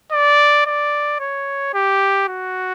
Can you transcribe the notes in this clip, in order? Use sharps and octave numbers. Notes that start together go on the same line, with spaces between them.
D5
D5
C#5
G4
F#4